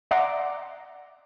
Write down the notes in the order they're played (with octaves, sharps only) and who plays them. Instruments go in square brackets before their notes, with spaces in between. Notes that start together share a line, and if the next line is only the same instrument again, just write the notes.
[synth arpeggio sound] D5 E5 F#5 A#5 C6 D6